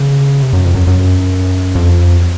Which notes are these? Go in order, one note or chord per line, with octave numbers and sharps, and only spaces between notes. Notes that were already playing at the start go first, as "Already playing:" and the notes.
Already playing: C#3
C3
F#2
F2
F#2
F#2
F2